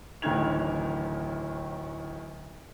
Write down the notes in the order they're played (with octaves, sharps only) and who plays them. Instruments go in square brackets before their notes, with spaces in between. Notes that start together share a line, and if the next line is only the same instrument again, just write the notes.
[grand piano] D1 A1 D2 D#3 G#6 F7